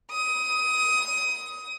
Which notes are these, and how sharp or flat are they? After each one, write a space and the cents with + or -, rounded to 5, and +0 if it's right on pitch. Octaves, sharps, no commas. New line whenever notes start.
D#6 +20